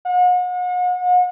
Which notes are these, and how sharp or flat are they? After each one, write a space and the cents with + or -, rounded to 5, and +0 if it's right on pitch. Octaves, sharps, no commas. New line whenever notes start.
F#5 -40